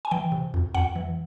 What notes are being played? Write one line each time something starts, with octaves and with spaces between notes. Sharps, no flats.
G#5
E3 G5
C3
F2
F2 F#5
E3